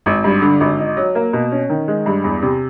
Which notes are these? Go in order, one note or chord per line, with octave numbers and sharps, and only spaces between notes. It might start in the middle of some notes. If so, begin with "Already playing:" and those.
G#1
G2
D3
G#1
D#4
F#3
A#3
B2
C#4
D#3
G#3
G2
E2
C3